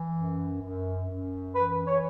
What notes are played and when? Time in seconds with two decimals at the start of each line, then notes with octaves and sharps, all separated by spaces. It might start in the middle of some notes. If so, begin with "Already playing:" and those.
Already playing: E3
0.14 F#2
0.61 F#2
1.09 F#2
1.55 E3 B4
1.87 C#5